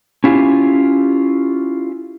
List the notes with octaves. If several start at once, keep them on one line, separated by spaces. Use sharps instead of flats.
C#4 E4 F4 G4 G#5